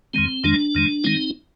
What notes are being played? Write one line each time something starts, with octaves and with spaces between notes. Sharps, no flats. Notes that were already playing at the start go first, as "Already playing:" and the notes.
F2 D#3 G#3 C4
F2 D#3 G#3 D4
F2 D#3 G#3
D#3 G#3 C4 D#4